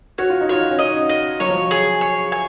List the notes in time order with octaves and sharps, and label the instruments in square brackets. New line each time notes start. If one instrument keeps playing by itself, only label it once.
[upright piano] F#4 [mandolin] C#5
[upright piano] F4
D#4
[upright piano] F4 [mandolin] C#5
[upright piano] C#4
[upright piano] D#4 [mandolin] D#5
[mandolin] D#5
[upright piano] F#3 [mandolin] C#5
[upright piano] F3
F#3
[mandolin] G#4
C#5
G#5